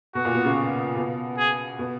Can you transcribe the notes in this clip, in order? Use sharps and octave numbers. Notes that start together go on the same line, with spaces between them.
B2 F#4
A#2
B2
C#3
B2
G#4
B2